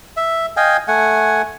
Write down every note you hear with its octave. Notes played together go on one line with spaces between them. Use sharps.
E5
D#5 F5 G5 G#5
A3 F#5 G#5